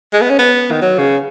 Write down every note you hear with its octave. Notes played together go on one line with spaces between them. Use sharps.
G#3
B3
C#4
B3
D#3
F#3
C#3